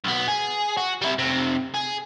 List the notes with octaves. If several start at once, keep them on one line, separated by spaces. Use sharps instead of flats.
B1 B3
G#4
F#4
G3 E4
F2 C3
G#4